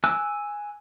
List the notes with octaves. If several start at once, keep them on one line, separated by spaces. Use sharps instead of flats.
G#5 D6 E6 F#6